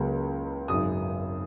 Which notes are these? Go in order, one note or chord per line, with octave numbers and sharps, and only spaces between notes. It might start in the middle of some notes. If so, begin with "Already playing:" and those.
Already playing: C#2 C#3 F#3 A#3
G#1 F#2 C#3 D#6